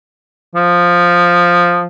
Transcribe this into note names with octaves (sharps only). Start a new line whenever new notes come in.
F3